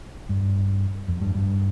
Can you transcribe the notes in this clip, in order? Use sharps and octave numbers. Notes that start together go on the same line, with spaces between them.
G2
F2
G2
G2